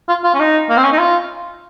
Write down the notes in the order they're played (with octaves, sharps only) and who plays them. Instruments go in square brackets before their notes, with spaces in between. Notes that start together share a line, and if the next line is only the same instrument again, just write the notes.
[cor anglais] F4
F4
C#4
D#4
A#3
C4
C#4
D#4
F4